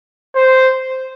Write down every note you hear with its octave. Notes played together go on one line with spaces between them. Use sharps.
C5